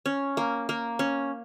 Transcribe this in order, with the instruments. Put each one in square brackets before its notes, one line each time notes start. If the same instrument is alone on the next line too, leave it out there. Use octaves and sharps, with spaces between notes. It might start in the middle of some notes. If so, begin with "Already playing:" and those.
[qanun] C#4
A#3
A#3
C#4